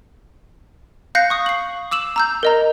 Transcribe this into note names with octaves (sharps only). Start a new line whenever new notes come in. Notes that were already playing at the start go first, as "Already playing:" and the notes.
F5 F#6 G6 A#6 C7 C#7
C#6 D#6
C7 F#7
D6 E6 E7 F#7
A#5 E6 G6
A#4 D#5 A#5